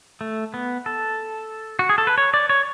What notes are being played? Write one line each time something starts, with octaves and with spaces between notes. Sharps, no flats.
A3
B3
A4
F#4
G#4
A4
B4
C#5
D5
C#5